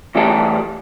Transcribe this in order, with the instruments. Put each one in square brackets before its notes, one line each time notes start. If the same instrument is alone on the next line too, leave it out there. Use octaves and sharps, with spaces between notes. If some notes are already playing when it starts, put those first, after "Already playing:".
[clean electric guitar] A2 E3 G3 G4 A4